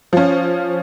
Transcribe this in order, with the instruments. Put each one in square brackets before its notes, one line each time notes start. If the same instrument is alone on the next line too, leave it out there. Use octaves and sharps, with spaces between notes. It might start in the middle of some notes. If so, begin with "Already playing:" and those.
[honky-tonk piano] F3 C#4